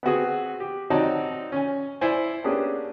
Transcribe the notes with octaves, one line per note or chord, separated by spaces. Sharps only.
B3 C4 F#4 G#4
G4
C4 D#4 F#4 C#5 D5 A5
C#4 G#5
E4 C5 D5 G#5
A#3 B3 C#4 D4 G4 G#4